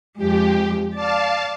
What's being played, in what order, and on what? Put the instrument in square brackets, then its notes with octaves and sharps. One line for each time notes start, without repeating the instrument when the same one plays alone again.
[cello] F2 G#3 [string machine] G4
[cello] D5 [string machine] F5 A5